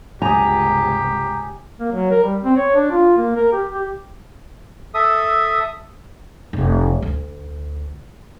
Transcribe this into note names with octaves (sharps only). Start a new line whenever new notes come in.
G1 C#2 C3 G4 G#5 A#5 D#6
A#3
F#3
A#4
G3
C4
C#5
D4
F4
A#3
A#4
G4
G4
A4 E5 D#6
F1
D2